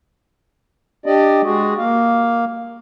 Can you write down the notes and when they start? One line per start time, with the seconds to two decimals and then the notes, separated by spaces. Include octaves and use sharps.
1.06 D4 G4 D5 D#5
1.44 G#3 F#4 G#4
1.78 A#3 F5